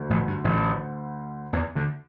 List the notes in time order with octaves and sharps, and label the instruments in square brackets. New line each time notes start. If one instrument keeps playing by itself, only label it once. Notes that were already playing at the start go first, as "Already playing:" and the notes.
Already playing: [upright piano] D2 D3
[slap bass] A1 A2
G2
A1 A2
E2 E3
D2 D3